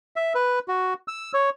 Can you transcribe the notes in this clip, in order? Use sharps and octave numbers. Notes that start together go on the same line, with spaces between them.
E5
B4
F#4
E6
C#5